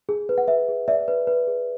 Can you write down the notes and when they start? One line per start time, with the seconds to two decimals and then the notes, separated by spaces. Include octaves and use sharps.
0.09 G#4
0.29 B4
0.38 F#5
0.48 B4 E5
0.68 G#4
0.88 D5 E5
1.08 B4
1.27 B4
1.47 G#4